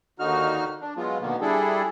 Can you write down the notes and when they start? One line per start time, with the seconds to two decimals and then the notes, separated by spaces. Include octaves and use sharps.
0.19 D#2 D3 D#4 F#4 F6
0.81 D4
0.97 F#3 G#3 B3 F4
1.21 B2 D3 D#3 A#3 B3
1.41 G3 D4 E4 G#4 A4